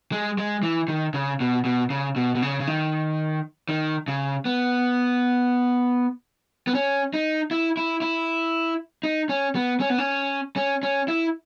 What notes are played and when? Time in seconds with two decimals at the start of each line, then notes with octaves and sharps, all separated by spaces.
0.12 G#3
0.38 G#3
0.63 E3
0.88 D#3
1.14 C#3
1.40 B2
1.65 B2
1.90 C#3
2.16 B2
2.35 B2
2.42 C#3
2.60 C#3
2.67 D#3
3.69 D#3
4.08 C#3
4.45 B3
6.67 B3
6.74 C#4
7.13 D#4
7.51 E4
7.77 E4
8.02 E4
9.03 D#4
9.29 C#4
9.55 B3
9.80 C#4
9.90 B3
9.98 C#4
10.56 C#4
10.83 C#4
11.08 E4